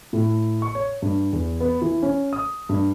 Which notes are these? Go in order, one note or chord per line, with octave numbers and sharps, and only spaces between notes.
A2
C#6
C#5
G2
E2
B3
E3
C#4
D#6
G2